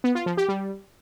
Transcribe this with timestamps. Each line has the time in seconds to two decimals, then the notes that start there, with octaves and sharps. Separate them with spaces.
0.04 B3
0.15 F4
0.26 F3
0.37 G4
0.49 G3